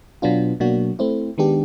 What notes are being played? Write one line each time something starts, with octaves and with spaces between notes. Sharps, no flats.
B2 F#3 B3 D4 F4
B2 F#3 A#3 D4 F#4
A3 C4 E4
D#3 G#3 B3 D4 G4